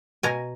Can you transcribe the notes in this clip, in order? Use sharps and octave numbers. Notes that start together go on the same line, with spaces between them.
B2 G#5 A#5